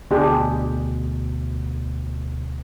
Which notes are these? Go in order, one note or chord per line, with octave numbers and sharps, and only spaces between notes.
D2 B2 D4 G4 G#4